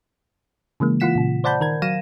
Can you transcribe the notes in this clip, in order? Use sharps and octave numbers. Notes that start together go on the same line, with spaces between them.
C#3 E3 G#3 A#3
E3 A#3 F4 F#5 B6 E7
A#2 C#3
C5 D5 F#5 A5 B5 G6
D#3 A#4 G#6
F#3 F5 A#6 D#7 E7